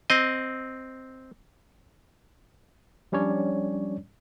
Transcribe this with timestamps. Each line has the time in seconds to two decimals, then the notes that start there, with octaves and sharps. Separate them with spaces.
0.10 C4 D#5
3.12 F3 G3 C#4 D4 C#5 D5